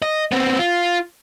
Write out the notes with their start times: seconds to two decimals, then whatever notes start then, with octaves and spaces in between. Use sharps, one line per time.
0.02 D#5
0.32 B3 C4
0.59 F4